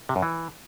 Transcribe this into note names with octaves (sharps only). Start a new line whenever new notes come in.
C3
F#2
E3